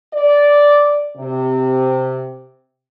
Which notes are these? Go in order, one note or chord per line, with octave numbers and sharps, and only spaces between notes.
D5
C3